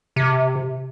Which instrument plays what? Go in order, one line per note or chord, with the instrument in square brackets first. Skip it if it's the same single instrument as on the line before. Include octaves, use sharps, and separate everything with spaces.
[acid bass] C3